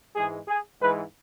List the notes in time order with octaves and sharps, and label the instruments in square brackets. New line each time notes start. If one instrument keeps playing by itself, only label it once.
[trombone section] G#2 E3 G#3 G#4
G#4
G#2 E3 G#3 B4